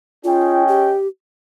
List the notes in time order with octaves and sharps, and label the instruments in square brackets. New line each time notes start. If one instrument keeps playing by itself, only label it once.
[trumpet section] C#4 G#4 D#5 G5 [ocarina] F4
[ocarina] G4